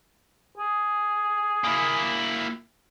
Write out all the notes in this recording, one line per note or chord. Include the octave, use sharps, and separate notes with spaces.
G#4
A#3 E4